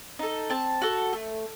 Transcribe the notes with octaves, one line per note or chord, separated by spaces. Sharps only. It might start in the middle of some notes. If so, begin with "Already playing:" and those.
D#4 A4
C4 A5
F#4 A4
A3